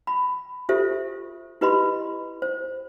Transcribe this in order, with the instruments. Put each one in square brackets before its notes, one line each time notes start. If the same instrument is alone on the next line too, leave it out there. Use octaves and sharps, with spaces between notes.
[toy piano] B5
F4 G4 A4 C5 E5
E4 G4 B4 D#5 B5 C6
C5